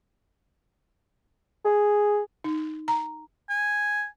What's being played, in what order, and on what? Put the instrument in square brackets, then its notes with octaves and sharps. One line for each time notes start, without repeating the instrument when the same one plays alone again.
[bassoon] G#4
[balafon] D#4
A#5
[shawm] G#5